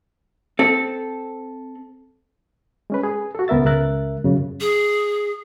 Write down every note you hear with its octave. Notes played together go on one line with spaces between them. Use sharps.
C4 A4
G#3 C#4 B4
G#4
F#4 A4
C#2 B3 A#4 E5 A6
C#2 A#4 E5 F#6 A6
F#2 C#3
G#4